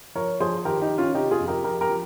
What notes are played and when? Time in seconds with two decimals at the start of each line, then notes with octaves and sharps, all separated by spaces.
0.15 F3 A#4 C#5
0.40 F3 G#4 C5
0.65 D#3 G4 A#4
0.82 D#4 G4
0.89 D#3
0.98 C#4 F4
1.14 C3 D#4 G4
1.31 F4 G#4
1.39 F2
1.48 G4 A#4
1.64 F3 G4 A#4
1.81 G4 A#4
1.89 F3